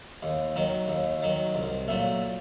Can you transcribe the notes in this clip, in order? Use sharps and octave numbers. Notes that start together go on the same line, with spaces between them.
D#2
D#3 F#3
D#2
D#3 F#3
C2
A#2 F#3 A3